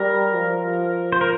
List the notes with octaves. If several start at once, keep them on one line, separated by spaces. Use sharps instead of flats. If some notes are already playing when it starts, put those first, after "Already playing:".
Already playing: G3 A#4
F3
C5
A#4